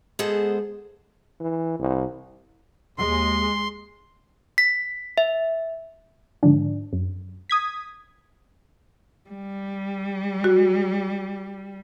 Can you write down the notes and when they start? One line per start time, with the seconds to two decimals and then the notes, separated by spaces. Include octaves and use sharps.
0.19 G#3 B3 G#4 A4 C5 F#5
1.40 E3
1.80 C2
2.98 D#2 G#3 C6
4.58 B6
5.18 E5
6.43 G#2 D3 F3 D4
6.93 F#2
7.50 D#6 G#6 B6
9.30 G3
10.44 F#4